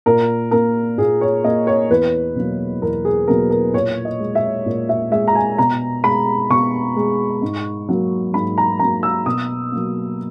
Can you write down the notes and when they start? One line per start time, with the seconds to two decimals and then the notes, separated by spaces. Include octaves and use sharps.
0.06 A#2 A#4
0.51 A#3 A#4
0.98 A#2 G#4
1.21 C#5
1.44 A#3 D#5
1.67 C#5
1.90 E2 B4
2.35 B2 F#3 A#3
2.82 E2 A#4
3.05 G#4
3.27 B2 F#3 A#3 A#4
3.50 A#4
3.74 A#2 C#5
4.05 D#5
4.20 G#3
4.35 E5
4.66 A#2
4.89 E5
5.11 G#3 E5
5.28 A#5
5.35 G#5
5.58 B2 A#5
6.04 G#3 B5
6.50 B2 C#6
6.96 G#3
7.42 G#2
7.89 F#3 A#3
8.33 G#2 B5
8.58 A#5
8.79 F#3 A#3 A#5
9.03 E6
9.26 B2 D#6
9.72 F#3 A#3